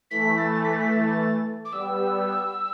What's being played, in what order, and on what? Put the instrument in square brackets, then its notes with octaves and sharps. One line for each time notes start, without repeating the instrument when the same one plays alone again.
[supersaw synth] E3 A3 [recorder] B6
[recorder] A6
B6
A6
B6
A6
D6
[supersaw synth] G3 B3 [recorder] E6